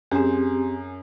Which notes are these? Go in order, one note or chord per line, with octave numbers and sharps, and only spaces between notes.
F#2 C4 G4 G#4